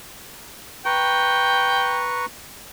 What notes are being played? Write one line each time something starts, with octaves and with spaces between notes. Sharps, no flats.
B4 G5 A#5 C#6